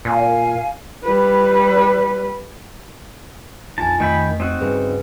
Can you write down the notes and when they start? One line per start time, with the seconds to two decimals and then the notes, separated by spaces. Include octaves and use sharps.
0.05 A#2 F5 G#5
1.04 G3 B4
3.78 A#1 F2 D#4 F4 G#5 A5
4.00 F2 D#3 A3 D#5 G5 B5 B6
4.40 C4 D#4 F#4
4.61 G2 C#3 G3 G#4 B4